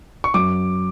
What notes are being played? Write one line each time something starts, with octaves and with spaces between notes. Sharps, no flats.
C#6
F#2 D6